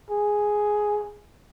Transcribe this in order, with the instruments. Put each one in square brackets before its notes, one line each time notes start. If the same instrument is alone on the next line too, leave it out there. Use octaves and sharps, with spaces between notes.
[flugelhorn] G#4